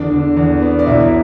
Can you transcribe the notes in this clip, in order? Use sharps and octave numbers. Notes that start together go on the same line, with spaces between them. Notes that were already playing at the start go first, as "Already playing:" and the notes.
Already playing: E2 D3 D4 D5
D3
E2
B3
D5
B1 E4 E5